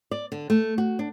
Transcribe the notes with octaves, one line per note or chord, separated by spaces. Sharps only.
D5
D3
A3
F#4
D4